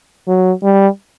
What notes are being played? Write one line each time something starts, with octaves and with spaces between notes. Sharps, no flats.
F#3
G3